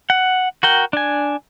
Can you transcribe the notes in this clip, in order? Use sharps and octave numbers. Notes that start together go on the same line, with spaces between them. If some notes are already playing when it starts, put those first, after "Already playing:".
F#5
F#4 A#4 G5
D4 G#5